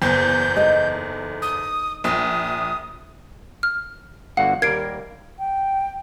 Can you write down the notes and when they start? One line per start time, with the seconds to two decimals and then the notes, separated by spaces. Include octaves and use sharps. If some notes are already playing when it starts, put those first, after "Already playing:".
0.02 F#1 E2 G6
0.57 D#4 A4 D#5
1.42 D#6
2.04 A#1 D#6
3.63 F6
4.37 G1 D3 F#4 F5 F#5
4.62 D#2 G3 A#3 A#4 G#6 C7 D7
5.39 G5